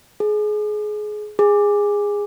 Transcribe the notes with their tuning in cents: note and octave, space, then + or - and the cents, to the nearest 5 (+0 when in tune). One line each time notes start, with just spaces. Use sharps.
G#4 +25
G#4 -15